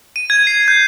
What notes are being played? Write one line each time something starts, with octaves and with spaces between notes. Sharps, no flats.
D#7
G#6
C7
G6